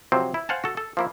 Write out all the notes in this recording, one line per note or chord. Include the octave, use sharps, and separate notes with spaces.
C3 F3 F#3 C4
E4
C5 F5 F#5 G#5 A5
F#4 A4
A4
F3 A#3 E4